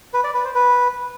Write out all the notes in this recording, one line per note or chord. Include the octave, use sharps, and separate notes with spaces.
B4
D5
B4
C5
B4